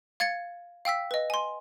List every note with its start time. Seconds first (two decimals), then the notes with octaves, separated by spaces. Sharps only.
0.20 F5 G#6 A6 C#7
0.85 F5 G5 E6 B6
1.11 B4 D#5
1.30 G#5 C6